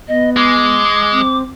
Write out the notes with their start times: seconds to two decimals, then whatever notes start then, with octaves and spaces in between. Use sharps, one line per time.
0.08 B3 D#5
0.37 G#3 D6
1.12 C4